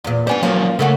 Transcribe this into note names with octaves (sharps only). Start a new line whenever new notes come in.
E2 A#2
G3 B3 D4 C5 G#5
F3 F#3 A#3 C#4 F4
C#3 A3 A#3 F#4